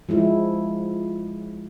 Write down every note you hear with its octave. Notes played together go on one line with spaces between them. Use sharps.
F3 G#3 E4